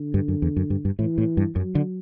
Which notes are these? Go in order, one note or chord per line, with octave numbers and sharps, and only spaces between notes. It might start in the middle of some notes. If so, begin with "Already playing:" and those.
Already playing: D3
G2
F#2
E2
F#2
G2
G2
A2 E3
A2
G2
F#2 F#3
D3